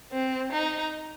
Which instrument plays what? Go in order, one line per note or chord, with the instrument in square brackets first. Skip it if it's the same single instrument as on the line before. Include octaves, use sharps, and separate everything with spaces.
[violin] C4
D#4